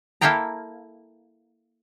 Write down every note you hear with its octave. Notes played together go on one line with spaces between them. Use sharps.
A#3 E4 A4 F5 G5 A#5